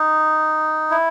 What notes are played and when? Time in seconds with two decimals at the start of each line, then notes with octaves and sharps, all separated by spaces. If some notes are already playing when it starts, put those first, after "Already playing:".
Already playing: D#4
0.91 E4